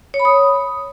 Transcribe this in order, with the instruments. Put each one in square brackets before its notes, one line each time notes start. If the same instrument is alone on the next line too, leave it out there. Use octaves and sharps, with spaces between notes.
[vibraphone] C#5
B5
D#6